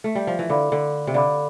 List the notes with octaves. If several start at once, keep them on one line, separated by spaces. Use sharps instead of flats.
A3
G3
F3
E3
D3 A4 D5 F5 B5 D6
D3
C3
D3 A4 D5 F5 B5 D6